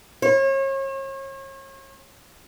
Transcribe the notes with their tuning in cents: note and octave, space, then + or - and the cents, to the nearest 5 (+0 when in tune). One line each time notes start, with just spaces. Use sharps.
C#5 -40